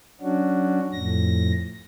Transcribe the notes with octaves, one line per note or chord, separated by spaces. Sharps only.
F#3 C#4 D4 F#4
F2 A2 A#6